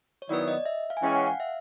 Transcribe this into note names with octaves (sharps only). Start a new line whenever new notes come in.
C#5
D#3 F#3 B3 E4 D5
D#5
E5
F5
G#5
E3 G#3 C#4 G5
F#5
F5
E5